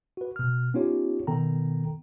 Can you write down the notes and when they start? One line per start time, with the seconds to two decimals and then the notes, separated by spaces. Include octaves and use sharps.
0.17 F#4 B4
0.36 B2 F6
0.74 B3 C#4 D#4 F4 G4 C#5
1.27 B2 D#3 B3 A4 G5 A#5